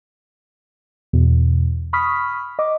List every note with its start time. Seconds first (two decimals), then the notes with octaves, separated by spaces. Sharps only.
1.13 E2 B2
1.93 B5 C#6 D#6 F6 B6
2.59 D#5 D6